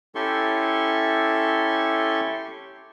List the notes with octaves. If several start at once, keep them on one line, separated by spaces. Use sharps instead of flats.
C#4 E4 G4 A4 C6 C#6